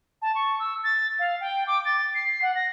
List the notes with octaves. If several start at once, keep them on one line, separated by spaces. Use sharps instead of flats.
A5
C#6
E6
A6
F5
G5
D6
A6
C7
F#5
A#6